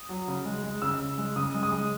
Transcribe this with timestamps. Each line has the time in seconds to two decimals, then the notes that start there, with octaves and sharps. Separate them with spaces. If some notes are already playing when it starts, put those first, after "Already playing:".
Already playing: D#6
0.09 F#3
0.28 C#3
0.45 G#3
0.64 G#3
0.82 C#3 E6
0.99 C#3
1.18 G#3
1.36 C#3 D#6
1.54 G#3
1.63 D#6
1.72 G#3